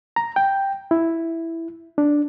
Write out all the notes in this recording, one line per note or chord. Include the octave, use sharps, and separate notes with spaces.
A#5
G5
E4
D4